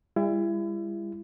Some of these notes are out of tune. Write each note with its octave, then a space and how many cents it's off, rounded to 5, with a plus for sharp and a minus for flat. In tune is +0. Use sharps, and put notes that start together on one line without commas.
G3 +45 E4 +35